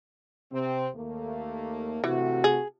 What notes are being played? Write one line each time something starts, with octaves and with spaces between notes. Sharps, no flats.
C3 C4
D#2 A3 A#3
C3 E3 A3 F#4
G#4